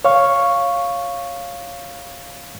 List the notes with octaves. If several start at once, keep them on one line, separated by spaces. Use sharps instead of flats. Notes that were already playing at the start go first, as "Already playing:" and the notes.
C#5 F5 C#6